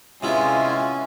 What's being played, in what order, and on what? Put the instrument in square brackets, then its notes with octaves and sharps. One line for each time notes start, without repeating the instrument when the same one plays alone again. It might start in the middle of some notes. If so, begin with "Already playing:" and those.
[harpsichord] C3 B3 E4 [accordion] G#3 F4 [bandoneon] C#4 [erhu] G#5